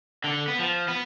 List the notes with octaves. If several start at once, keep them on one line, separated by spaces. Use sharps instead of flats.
D3
B3
F3
B3